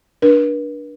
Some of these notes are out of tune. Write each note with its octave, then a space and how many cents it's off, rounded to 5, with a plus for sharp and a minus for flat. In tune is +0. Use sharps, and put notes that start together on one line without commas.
D4 +5 B4 -45